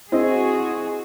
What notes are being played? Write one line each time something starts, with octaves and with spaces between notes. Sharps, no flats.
C4 E4 F#4 G#4 D#5